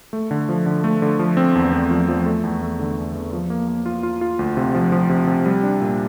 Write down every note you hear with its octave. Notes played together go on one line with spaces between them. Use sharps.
A3
D3
F3
D3
A3
D3
F3
C4
E2
C4
F3
F3
A3
E2
A3
D3
E2
E2
F3
A#3
A#3
F4
F4
F4
D2
C3
F3
F3
C3
C3
G3
D4
A#2